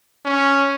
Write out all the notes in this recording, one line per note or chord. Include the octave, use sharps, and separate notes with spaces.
C#4